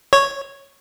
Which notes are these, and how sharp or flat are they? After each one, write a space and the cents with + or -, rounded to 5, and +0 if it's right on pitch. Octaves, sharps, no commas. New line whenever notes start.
C#5 -5